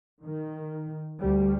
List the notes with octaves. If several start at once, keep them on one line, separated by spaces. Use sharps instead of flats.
D#3
D2 G3